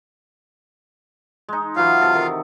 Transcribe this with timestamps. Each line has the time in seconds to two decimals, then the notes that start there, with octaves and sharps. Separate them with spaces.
1.49 G#3 D#4
1.76 E3 F#3 F4 F5
2.01 C3 A4
2.15 D#3